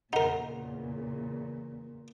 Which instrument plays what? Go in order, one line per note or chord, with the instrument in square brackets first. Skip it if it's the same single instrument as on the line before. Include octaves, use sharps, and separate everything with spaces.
[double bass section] E2 C#3 [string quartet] A#2 [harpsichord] D#4 A#4 [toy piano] F#5